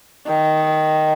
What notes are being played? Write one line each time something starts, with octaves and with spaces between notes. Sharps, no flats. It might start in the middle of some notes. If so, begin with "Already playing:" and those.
D#3